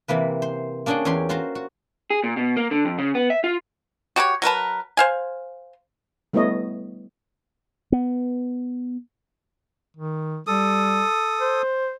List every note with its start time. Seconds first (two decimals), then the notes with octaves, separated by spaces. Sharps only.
0.08 C3 E3 A#3 B4
0.42 C5
0.86 A#3 C#4 D4 G#4 F#5 G5
1.05 E2 C#4 G4 A#5 C6
1.29 F4 F#4 C5 F5 A#5
1.55 F#4
2.10 G#4
2.24 A#2
2.37 B2
2.57 A#3
2.71 D3
2.85 F2
2.99 C#3
3.15 B3
3.30 E5
3.44 F4
4.16 F#4 G4 A#4 C#5
4.42 F#3 A#4 B4 A5
4.97 C5 F5 G#5
6.33 G3 A3 B3 E4 C#5 D#5
7.92 B3
9.97 D#3
10.47 G3 A4 D#6
11.41 C5